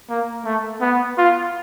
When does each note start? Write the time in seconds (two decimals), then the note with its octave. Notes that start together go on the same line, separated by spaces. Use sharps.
0.10 A#3
0.45 A3
0.81 B3
1.18 F4